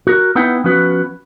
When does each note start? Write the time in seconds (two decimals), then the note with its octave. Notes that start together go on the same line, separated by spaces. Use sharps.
0.07 F#4 A#4
0.35 B3 D#4 E4 B4 F#5 G5
0.64 F3 B3 C#4 F#4 B4